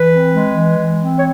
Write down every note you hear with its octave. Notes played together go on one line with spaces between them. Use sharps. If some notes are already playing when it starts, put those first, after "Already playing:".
Already playing: E3 B4
C4
G#3
E3
E3
C4
C#5